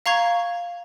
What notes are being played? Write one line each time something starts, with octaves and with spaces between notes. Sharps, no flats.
F5 A#5 C#6 G#6